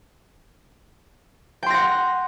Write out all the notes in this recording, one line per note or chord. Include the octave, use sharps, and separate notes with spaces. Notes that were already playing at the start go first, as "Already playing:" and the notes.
F#5 G5 C6 A#6